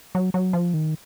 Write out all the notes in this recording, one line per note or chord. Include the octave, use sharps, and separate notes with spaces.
F#3
F#3
F3
D#3